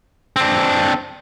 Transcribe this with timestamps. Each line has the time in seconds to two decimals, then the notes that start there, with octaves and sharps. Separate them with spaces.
0.36 C4 D4